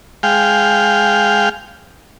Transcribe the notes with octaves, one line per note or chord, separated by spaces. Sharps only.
G#3 F5 G5